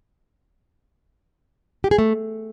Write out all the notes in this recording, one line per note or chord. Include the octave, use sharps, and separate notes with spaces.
G4
G#4
A3